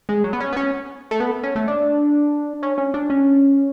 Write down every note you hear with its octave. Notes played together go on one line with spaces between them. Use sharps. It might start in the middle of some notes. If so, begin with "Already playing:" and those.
G#3
F#3
B3
C#4
B3
C#4
A3
B3
C#4
A3
D4
C#4
C#4
D4
C#4